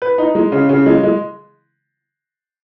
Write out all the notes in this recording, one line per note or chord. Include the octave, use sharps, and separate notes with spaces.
B4
D#4
G#3
C#3
C#3
G#3
G#3